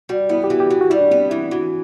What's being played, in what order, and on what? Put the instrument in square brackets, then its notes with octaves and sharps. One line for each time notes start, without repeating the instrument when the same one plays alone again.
[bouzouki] G3 [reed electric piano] F#4
[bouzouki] B3 [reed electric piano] E4
[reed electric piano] G4
[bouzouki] E3 [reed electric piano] F#4
[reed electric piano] G4
[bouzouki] E3 [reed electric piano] F#4
[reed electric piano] F#4
[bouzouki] G3 [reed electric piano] E4
[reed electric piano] D4
[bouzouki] B3 [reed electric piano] C4
[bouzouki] E3 [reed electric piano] E4
[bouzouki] E3 [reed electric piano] F#4